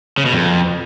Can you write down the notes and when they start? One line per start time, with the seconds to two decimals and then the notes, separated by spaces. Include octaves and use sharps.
0.18 C#3
0.26 B2
0.34 F2